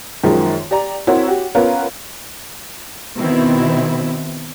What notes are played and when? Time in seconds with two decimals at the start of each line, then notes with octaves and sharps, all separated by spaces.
0.24 F#2 D#3 F3 G#3
0.71 G4 D5 A#5
1.07 C4 E4 F#4 A#4 C#5
1.27 F#4 G4
1.55 B3 C#4 F4 A#4 B4
3.16 B2 D#3 C4 E4